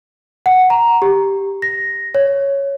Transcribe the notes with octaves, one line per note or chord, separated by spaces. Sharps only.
F#5
A#5
G4
A#6
C#5